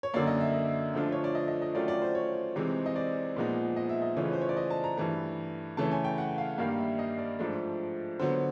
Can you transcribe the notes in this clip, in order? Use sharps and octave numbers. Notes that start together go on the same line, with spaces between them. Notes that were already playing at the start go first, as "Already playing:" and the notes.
C#5
F#2 D3 F#3 A#3 D5
D#5
E5
D#5
D3 F3 A3 D4 F4
C#5
D5
D#5
D#5
D#5
D#3 F#3 A3 C#4 F4 D5
D5
C5
C#5
C3 E3 G#3 C4 D#4
D#5
D5
A#2 F3 G#3 B3 D#4
D#5
E5
D#5
C#3 E3 A3 C#4 F4
B4
C5
C#5
D5
D#5
A5
A#5
G2 E3 A3 A5
C#3 E3 A3 C#4 A5
G#5
G5
F#5
F5
G2 D#3 G3 A#3 F5
E5
D#5
D5
G#2 F3 A3 D4
D3 F#3 B3 C5